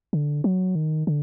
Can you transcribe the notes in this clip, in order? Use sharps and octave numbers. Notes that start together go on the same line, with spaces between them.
D3
F#3
D#3
D3